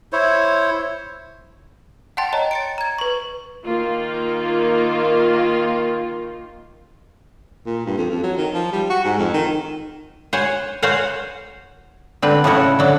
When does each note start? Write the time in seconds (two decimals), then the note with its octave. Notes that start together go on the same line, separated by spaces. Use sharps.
0.13 E4 C5 C#5
2.17 F#5 G5 A5 C6 A6
2.33 C#5 D#5 A5 A#5
2.51 A6 C#7 D7
2.78 A#5 G#6
2.98 B4 C#6
3.65 D#3 A#3 F4
7.66 A#2
7.86 G2
7.98 F2
8.10 F2
8.23 F#3
8.37 D#3
8.54 F3
8.72 G3
8.90 F#4
9.05 G#2
9.18 F2
9.34 D#3
10.33 C5 C#5 F#5 G#5
10.82 F#4 C5 C#5 F5 F#5 G#5
12.22 D3 C4 B4
12.44 A2 C#3 F3 C#4 E4 F#4
12.79 D3 F#3